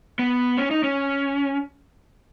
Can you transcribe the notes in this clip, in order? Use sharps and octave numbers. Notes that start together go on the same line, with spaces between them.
B3
C#4
D#4
C#4